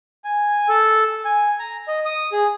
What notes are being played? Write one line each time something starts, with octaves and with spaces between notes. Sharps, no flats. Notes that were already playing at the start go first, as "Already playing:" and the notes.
G#5
A4
G#5
A#5
D#5
D#6
G#4